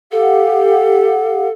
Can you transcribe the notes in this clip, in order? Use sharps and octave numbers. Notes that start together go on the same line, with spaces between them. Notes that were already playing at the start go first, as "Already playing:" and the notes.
G4 A4 F5 F#5